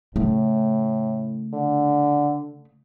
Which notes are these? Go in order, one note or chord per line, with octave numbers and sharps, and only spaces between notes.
A2 C#3 A3
D3